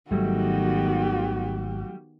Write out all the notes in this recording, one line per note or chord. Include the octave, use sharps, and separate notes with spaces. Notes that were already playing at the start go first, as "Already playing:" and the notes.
G#1 D#3 F#3 G3 A3 B3 F#4 G4